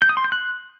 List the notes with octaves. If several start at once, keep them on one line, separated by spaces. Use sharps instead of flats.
G6
D#6
C6
G6
F#6